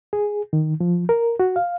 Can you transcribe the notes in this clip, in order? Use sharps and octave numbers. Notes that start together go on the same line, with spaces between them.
G#4
D#3
F3
A#4
F#4
F5